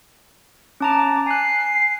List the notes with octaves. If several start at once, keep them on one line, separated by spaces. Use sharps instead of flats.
C#4 A5 A#5 D6
G#5 F#6 C7